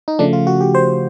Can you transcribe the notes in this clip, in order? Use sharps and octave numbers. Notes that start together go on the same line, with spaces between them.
D#4
C#3 F3 A3 D4
F4
F#4
G4
C5